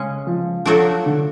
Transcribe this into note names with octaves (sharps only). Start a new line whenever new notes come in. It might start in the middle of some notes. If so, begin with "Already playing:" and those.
Already playing: C#3 G#3 C#4
F3
F3 F#3 A3 D4 F#4 A4
D3